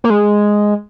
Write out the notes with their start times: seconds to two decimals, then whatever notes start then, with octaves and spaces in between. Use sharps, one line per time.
0.04 A#3
0.10 G#3